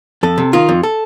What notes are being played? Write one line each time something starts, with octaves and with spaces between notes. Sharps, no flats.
F2 A4
C3
D#3 F4
F2
A4